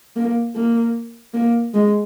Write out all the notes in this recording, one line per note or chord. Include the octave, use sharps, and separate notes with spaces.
A#3
A#3
A#3
G#3